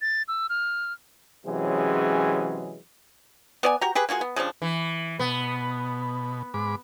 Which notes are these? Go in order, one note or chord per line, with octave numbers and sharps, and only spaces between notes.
A6
E6
F6
C3 E3 F#3 G#3 C#4 G#4
B3 D5 G#5
F#4 G4 A#5
G4 G#4 B4
A#3 F4 F#4 G#4
B3
C#3 F3 G3 D4
E3
B2 B3
G#2 B5 D6